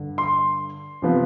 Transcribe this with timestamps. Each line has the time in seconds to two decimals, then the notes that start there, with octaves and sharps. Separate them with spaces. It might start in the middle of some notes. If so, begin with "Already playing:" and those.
Already playing: G2 D3
0.18 C6
1.02 C3 F3 B3